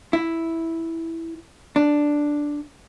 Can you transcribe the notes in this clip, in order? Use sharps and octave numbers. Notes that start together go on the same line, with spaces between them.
E4
D4